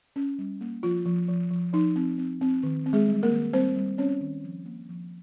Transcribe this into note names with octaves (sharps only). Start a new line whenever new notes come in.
C#4
G3
A#3
F3 F4
F3
F3
F3
F3 D#4
C4
C4
C4
D#3
C4
G#3 G#4
G3
A#3 A#4
D#3
G3 C4 C5
G3
C4 C#4 C#5
D#3
F3
A#3
F3